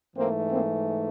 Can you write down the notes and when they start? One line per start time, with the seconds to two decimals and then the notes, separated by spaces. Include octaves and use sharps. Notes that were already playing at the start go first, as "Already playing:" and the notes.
0.16 G#2 E3 A3 A#3 C4
0.50 A#3 C4